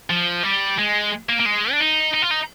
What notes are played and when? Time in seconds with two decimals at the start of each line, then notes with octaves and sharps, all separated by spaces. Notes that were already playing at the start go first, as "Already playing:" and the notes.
0.10 F3
0.43 G3
0.78 G#3
1.29 A#3
1.40 A#3
1.45 G#3
1.72 D4
1.80 D#4
2.14 D#4
2.22 F4
2.31 D#4